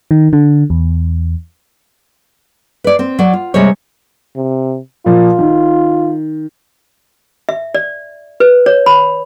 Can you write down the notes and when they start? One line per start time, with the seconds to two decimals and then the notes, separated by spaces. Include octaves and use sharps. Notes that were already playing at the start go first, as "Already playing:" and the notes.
0.11 D#3
0.33 D3
0.70 E2
2.84 B4 D5
2.99 C4
3.19 F#3 D5
3.33 F4
3.54 C3 G3 G#3 C5 C#5
4.36 C3
5.06 A#2 F3 F4
5.39 D#3
7.49 E5
7.74 D5
8.40 B4
8.66 C#5
8.86 B5